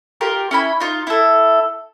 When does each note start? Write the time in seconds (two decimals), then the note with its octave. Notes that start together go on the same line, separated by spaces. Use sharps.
0.21 F4 G4 A#4
0.51 C#4 E4 B5
0.80 D#4 F4
1.07 E4 A4